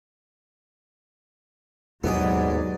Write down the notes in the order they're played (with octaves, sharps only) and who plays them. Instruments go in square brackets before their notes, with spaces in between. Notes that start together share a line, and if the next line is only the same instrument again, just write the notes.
[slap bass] D#2 B2 [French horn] G#2 [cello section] F#3 D5 [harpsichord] B3 G#4